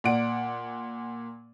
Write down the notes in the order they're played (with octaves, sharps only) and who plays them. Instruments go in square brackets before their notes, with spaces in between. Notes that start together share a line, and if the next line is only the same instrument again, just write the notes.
[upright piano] A#2 D5 F#5 D7